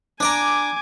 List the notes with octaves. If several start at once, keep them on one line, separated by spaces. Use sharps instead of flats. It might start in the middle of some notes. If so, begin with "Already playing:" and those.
D4 D5 G#5 A#5 D6